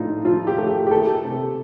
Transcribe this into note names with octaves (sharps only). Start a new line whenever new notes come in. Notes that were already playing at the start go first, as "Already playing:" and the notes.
Already playing: A2 F3 D4 D#4 F4
F3 F4
G4
A3
G4
G4
A3 A4
C3